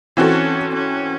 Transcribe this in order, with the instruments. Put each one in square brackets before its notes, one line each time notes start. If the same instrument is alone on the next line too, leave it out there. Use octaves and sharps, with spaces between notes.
[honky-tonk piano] E3 C4 F#4 A4 [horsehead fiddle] C#4
[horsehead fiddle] C#4